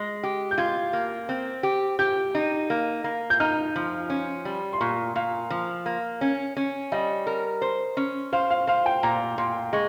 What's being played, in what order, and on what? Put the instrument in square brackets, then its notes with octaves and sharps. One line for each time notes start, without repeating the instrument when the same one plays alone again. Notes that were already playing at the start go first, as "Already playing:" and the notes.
Already playing: [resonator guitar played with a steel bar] G#3 [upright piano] A#6
[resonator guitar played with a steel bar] G4
[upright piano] G6
[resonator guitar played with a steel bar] F4 [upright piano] G#6
[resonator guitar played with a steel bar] A#3
C4
G4
[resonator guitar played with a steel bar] G4 [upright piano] G6
[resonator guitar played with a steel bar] D#4
A#3
A#3
[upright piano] G6
[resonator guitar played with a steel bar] D#4 [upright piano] F6
[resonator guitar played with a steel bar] F3
C#4
G3
[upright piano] C6
[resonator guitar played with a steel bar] A#2 [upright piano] C#6
[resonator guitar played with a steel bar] A#2 [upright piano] F5
[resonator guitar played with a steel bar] F3
A#3
C#4
C#4
[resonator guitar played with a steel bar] G3 [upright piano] D#5
[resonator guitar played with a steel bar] A#4
C5
C#4
[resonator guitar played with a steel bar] C5 [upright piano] F5
[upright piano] F5
[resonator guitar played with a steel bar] C5 [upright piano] F5
[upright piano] G5
[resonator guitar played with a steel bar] A#2 [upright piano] A#5
[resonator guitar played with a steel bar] A#2 [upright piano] C6
[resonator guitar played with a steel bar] G#3 [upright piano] C#6